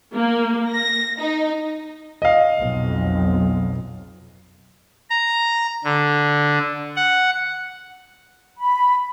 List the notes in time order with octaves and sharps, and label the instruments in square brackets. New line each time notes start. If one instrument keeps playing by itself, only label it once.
[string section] A#3
A#6
D#4
[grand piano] D#5 F5
[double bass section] B1 F2
[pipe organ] A#5
D3
F#5
[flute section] B5